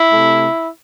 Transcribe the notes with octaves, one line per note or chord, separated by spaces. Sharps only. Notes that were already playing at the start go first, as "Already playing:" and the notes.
Already playing: E4
C3 A3